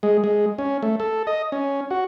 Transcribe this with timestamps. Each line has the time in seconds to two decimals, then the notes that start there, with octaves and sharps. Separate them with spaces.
0.03 G#3
0.24 G#3
0.58 C#4
0.83 A3
1.00 A4
1.27 D#5
1.52 C#4
1.91 F#4